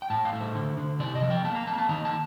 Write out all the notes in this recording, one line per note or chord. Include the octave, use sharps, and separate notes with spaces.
G5
A2 A5
F5
A3
C5
D3
D3
C3 D5
D#5
F3
G5
A#3 A5
A#5
A#3 A5
A#5
A5
D#3 A#5
A5